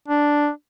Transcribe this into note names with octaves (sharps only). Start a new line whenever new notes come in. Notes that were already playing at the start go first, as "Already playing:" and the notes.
D4